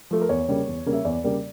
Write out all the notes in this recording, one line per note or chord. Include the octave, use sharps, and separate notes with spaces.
F3 A3
A#4
E2 C#5
C#3 G3 A#3
E2
C#3 G3 A#3
E5
E2 D5
C#3 G3 A#3